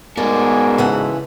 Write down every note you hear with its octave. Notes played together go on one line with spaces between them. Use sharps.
G#2 B2 G#3 B3 A#4 D5 G#5
C#3 E3 A4 F#5